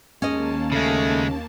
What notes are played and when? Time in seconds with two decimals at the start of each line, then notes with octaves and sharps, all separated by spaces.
0.22 D#2 G#3 A#3 C#4 D#5 A5
0.72 C#3 G#3 A3